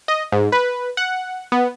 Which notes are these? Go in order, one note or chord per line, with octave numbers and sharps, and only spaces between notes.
D#5
G#2
B4
F#5
B3